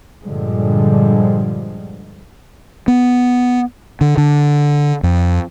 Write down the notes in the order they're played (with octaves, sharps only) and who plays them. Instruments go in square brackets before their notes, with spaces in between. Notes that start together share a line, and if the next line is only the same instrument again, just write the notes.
[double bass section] G2 A#2 D3 F3 G3 G#3
[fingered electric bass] B3
D3
D3
F2